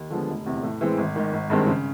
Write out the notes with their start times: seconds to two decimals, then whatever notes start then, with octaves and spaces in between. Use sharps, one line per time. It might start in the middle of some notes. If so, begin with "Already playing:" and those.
Already playing: D#2
0.10 D3 F3 G#3 B3
0.29 F1
0.46 E2 C3
0.63 A2
0.81 E3 G#3 C4
0.98 G#1
1.16 G#2 D#3
1.33 G#1
1.50 G2 D#3 G#3 C4
1.67 C#3